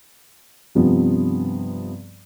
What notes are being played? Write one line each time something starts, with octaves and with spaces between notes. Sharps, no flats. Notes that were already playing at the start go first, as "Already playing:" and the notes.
G2 C3 F3 B3